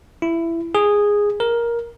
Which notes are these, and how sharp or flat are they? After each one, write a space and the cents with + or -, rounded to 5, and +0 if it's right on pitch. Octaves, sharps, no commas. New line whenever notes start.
E4 +15
G#4 -10
A#4 +10